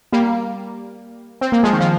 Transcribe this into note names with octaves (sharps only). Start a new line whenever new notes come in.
G3 A#3
C4
A#3
F3 G#3
D#3
F3